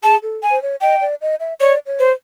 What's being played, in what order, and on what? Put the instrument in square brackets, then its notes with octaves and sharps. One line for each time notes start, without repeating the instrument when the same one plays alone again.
[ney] G#4 [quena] A5
[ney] A4
[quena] G#5
[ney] C5
C#5
[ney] D#5 [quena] G5
[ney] D5
D#5
E5
[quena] C#5 [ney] D5
[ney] C#5
[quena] C5